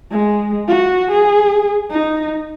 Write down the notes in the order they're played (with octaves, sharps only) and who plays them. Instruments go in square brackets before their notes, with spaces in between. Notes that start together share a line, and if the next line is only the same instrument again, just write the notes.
[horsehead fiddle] G#3
F#4
G#4
D#4